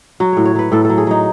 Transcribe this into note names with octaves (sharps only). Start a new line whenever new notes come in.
F#3 F#4
A2 C#5
C#5
F#3 B4
A2 A4
F#3 A4
G#4
F#3 D#4